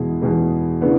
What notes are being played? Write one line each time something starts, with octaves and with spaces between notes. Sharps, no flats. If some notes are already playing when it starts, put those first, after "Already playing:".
Already playing: E2 B2 G#3
E2 B2 G#3
C#3 E3 B3 D4